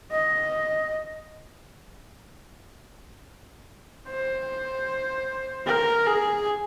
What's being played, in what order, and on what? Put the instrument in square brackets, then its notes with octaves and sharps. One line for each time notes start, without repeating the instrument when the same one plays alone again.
[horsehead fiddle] D#5
C5
A#4
G#4